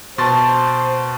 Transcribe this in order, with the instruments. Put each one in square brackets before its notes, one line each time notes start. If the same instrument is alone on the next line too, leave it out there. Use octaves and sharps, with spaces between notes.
[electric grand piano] B2 C6 A6 [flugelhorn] C5 [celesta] A5 C#6